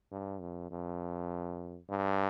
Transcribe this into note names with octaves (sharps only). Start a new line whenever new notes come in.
G2
F2
F2
G2